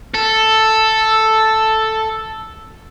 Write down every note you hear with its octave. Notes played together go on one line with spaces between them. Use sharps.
A4 E6